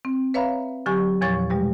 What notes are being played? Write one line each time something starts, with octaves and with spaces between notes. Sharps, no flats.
C4
B4 C#5 E5 F5 A#5 B5
D3 F#3 G4 G#5 C#6
E2 A#2 F3 C#5 C#6 A6
B2 G3 G#3 G4